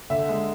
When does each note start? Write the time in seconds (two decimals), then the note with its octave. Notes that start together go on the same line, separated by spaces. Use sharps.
0.10 D3 E5
0.29 G#3